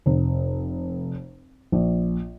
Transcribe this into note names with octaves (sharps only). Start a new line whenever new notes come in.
F1
A#1